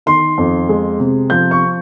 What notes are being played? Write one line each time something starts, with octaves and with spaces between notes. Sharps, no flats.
D#3 C6
F2
G#3
C3
F3 G6
C#6